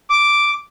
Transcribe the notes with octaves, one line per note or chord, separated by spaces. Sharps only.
D6